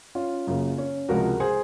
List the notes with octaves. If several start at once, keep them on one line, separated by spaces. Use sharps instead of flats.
C#4 F4
F#2 C#3 F#3 A#3
C#4
C#2 C3 F3 G#3 F#4 A#4
G#4 C5